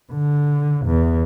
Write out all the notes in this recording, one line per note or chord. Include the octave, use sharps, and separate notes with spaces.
D3
E2